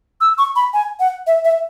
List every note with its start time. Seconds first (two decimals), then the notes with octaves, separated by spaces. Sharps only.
0.21 E6
0.38 C#6
0.56 B5
0.74 G#5
1.00 F#5
1.27 E5
1.45 E5